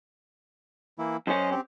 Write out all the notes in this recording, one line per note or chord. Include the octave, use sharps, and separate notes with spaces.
E3 A#3 E4
F#2 C#4 C5 D#5
C4 G4